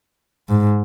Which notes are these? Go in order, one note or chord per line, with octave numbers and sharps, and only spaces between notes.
G#2